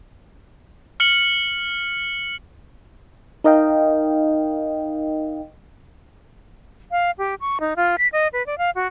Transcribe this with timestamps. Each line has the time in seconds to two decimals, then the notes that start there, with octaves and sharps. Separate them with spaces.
1.00 F6 C#7 F#7
3.44 D#4 A#4 D#5 F5 G5
6.91 F5
7.18 G4
7.41 C#6
7.60 D#4
7.76 F4
7.98 B6
8.13 D#5
8.33 B4
8.46 D5
8.58 F5
8.75 F#4